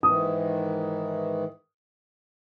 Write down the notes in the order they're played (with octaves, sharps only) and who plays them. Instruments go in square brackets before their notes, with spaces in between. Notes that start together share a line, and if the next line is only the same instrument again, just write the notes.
[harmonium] G#2 D#3 E3 [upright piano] D#6